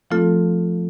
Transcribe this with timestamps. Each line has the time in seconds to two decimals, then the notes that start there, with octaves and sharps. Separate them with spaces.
0.11 F3 A3 C4 F4 A4